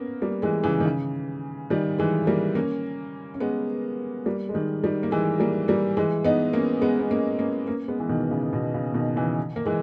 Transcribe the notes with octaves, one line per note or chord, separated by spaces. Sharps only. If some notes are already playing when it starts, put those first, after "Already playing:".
Already playing: A#3 B3 C#4
G3 A#3
E3 G#3
C#3 E3
D#3
C#3
D#3 G3
E3 G#3
G3 A#3
A#3 C#4
C#4
G#3 B3
G3 A#3
G#3
D#3 G3
D#3 G3
A#3
E3 G#3
G3 A#3
G3 A#3
E3 G#3
B3 D#4
A#3 C#4
G#3 B3
B3
A#3 C#4
A#3 C#4
A#3 C#4
G#3 B3
E3
B2 D#3
C#3
B2
C#3
B2 D#3
C#3 E3
A#3
E3 G#3